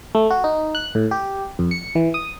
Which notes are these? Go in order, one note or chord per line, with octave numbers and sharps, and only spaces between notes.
A3
F#4
D#4
F#6
A2
G4
F2
C#7
E3
D#6